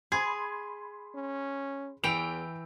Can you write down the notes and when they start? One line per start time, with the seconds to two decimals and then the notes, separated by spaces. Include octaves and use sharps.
0.12 G#4 B5 C6 G#6
1.14 C#4
2.04 E2 E3 G5 E6 D7 F7